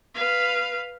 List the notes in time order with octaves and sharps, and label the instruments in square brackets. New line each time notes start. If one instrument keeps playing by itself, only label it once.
[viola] B4 F5